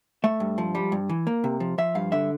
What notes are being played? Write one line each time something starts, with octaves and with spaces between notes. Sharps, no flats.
A3 E5
G2
F3
G3
G2
E3
A#3
C3
F3
F3 E5
G2 F5
D3 E5